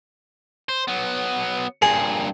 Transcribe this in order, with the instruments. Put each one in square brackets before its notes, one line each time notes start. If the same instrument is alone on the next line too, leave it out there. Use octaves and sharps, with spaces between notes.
[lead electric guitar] C5
F#3 B3
[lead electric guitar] G2 A#2 [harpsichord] G#4